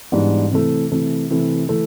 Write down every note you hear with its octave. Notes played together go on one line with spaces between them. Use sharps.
G#2 E3 G3 B3 D4
C3 E3 A3
C3 E3 A3
C3 E3 A3
E3 A3